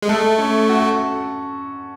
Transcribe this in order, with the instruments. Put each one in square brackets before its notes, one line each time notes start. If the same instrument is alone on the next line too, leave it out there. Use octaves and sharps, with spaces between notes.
[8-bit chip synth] G#3
[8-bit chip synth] A3 [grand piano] A4
[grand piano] C#4
F#4